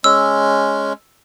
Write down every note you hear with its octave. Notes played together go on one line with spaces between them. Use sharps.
G#3 C#4 E6